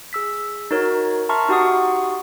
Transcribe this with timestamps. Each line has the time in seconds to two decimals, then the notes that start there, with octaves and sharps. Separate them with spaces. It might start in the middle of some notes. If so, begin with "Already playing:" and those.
0.13 G#4 E6 B6
0.71 D#4 F#4 A#4 C#5
1.29 E5 A5 A#5 C6 C#6 F6
1.49 D#4 F#4 G4 F#5 C#6 D#6